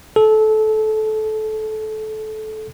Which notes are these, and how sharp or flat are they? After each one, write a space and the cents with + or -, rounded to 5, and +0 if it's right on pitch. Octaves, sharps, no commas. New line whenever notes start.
A4 -20